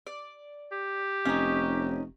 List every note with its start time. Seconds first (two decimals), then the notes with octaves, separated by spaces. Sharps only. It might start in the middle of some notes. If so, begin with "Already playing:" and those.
0.07 D5
0.72 G4
1.25 F1 C#4 D#4